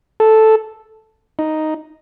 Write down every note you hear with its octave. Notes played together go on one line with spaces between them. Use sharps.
A4
D#4